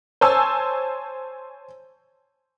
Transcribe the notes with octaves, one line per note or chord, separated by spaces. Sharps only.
C5 C#5 G#5 A5 E6